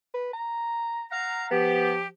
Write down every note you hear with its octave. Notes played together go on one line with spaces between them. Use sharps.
B4
A#5
F5 F#5 A#5
F3 B3 G4